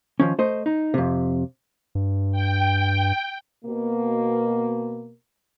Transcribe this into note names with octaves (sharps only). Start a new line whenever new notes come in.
D#3 F3 C#4
A3 C5 D#5
D#4
F2 C3
G2
G5
B2 A#3